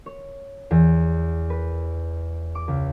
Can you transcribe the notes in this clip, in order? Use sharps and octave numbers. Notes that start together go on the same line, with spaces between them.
C#5
E2
B4
D6
C#2